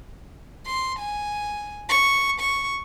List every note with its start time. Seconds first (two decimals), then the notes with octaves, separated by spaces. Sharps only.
0.66 C6
0.99 G#5
1.89 C#6
2.40 C#6